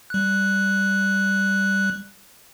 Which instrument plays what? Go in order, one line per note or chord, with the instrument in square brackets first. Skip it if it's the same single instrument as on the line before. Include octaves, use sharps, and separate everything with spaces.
[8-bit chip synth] G3 F#6